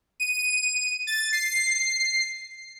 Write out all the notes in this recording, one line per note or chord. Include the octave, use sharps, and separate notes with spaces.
D#7
A6
C7